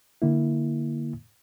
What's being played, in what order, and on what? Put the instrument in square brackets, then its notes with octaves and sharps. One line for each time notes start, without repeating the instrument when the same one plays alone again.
[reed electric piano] D3 A#3 E4